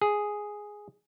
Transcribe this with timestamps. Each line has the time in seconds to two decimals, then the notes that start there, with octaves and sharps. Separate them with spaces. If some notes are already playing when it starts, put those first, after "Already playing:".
0.01 G#4